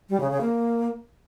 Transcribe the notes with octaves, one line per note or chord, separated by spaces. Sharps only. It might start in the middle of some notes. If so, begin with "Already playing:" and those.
G3
C#3
C#3
A#3